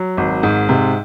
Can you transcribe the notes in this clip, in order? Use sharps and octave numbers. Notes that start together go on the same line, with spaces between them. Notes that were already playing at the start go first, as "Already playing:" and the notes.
Already playing: F#3
G#1
G#2
C3